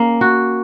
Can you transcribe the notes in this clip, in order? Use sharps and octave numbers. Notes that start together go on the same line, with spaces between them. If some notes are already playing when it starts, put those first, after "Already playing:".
Already playing: A#3 C#4
F#4